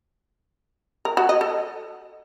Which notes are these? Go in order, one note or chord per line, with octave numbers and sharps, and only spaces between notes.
A#4
F#4
D#5
A4